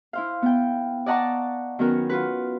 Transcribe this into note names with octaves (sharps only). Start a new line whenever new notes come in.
E4 C5 F5
B3 G5
D5 D#5 F#5 A5 A#5 C#6
D#3 F#3 B3 C#4 F#4 A#4
F4 F#4 B4